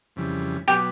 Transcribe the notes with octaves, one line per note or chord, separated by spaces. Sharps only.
F2 C#3 E3 G3
B2 F#3 B3 G4